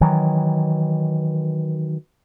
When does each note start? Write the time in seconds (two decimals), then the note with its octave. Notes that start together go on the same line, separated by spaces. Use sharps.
0.01 D#3 E3 F#3